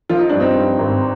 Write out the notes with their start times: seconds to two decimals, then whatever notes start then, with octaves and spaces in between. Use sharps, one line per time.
0.09 F3 F4
0.19 D#4
0.29 G2 D4
0.40 C4 D#4
0.55 G2
0.79 G#1